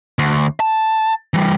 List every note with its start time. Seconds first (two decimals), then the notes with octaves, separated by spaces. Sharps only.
0.19 D2
0.60 A5
1.34 E3 G3